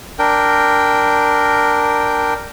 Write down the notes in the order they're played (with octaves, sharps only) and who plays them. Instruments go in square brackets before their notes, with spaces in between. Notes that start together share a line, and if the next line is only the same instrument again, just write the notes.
[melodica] D4 A#4 G5